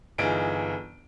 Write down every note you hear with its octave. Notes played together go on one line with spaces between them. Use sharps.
G1 E3 D#4 F4 G#4 D7